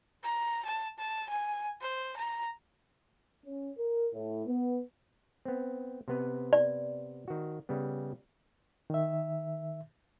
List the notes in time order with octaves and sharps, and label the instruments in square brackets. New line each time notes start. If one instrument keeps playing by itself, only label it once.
[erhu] A#5
A5
A5
G#5
C5
A#5
[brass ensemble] C#4
A#4
A2
B3
[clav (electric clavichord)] B3 C4
C3 B3 B4
[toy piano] D5
[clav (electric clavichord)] D#3 F#4
C#3 G3 B3
[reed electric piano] D#3 E5